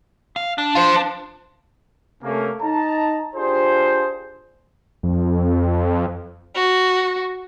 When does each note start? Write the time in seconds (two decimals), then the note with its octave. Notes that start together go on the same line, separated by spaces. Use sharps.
0.36 F5
0.58 D4
0.75 F4 C5
2.23 C3 A3 A#3 C#4
2.62 D#4 A5 A#5
3.35 D4 F4 G4 G#4 C5
5.03 F2
6.55 F#4